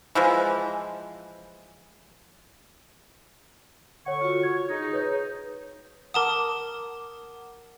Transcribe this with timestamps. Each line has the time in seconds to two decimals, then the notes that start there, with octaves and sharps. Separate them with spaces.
0.15 E3 F3 G#3
4.06 D3 C#5 F#5 C#6
4.21 F4 F#4
4.43 C#5 G#6
4.69 D#4 G#4
4.93 B4 C#5 G6
6.14 A#4 F#5 A5 A#5 D6 D#6